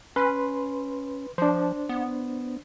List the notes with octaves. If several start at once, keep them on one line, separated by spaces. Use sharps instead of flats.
C#4 B4 C6
F3 D4 C5
B3